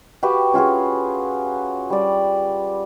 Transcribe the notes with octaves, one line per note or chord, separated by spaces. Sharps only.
F#4 G4 B4 F5
C#4 F4 F#4 G#4
G3 D5